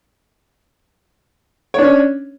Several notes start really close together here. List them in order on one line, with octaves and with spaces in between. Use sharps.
C#5 D4 C#4